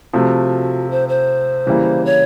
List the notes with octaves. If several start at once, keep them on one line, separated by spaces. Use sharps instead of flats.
C3 F3 A3 F#4
C5
C5
C#3 E3 G3 A#3
C#5